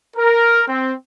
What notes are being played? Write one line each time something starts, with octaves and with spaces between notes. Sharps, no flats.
A#4
C4